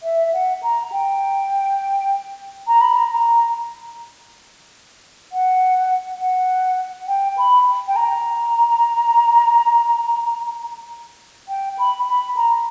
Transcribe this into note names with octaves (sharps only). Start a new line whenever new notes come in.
E5
F#5
A#5
G5
A#5
B5
A#5
A#5
F#5
F#5
G5
B5
G5
A#5
G5
B5
B5
A#5